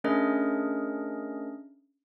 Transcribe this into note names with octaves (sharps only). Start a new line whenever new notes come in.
A3 C#4 D4 G#4 A#4 D#5